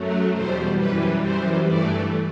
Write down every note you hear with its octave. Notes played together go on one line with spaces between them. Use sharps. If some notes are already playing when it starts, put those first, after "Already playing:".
Already playing: F#2 F#3 A3
E2 B2 G3 C5
F#2 E3 G3 B4
F#2 E3 G3 C5
G2 E3 A3 D5